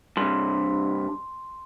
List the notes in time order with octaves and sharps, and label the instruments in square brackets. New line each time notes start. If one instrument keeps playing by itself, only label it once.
[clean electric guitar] G2 C3 [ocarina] D4 [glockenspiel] C6